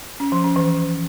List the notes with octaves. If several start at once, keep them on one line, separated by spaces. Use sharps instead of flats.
C#4
F3
C#4
E3